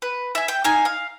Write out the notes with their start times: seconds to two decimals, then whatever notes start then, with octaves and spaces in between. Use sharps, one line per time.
0.02 B4
0.35 E5 G#5
0.48 G5
0.64 D#4 F5 G#5
0.85 F5